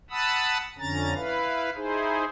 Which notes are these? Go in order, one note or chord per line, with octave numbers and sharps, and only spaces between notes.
F#5 A5 B5 D#6 E6
F2 D3 C#4 A#5 A6
E4 B4 F5
D#4 E4 G#4 C5